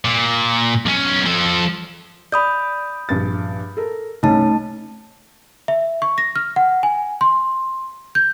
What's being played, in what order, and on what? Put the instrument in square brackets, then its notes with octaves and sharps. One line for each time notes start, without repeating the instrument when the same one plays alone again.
[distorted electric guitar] A#2
B1 C#4
F3 A4
[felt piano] D5 [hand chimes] B5 D#6 G6
[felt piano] A#1 G2 A6
A4 A#4
[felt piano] C2 C#4 [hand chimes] A3 D#4 A5
[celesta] E5
C#6
A#6
F6
F#5
G#5
C6
G6